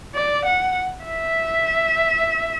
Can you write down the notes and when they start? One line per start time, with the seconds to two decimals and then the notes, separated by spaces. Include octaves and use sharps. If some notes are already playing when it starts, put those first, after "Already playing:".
0.15 D5
0.45 F#5
1.05 E5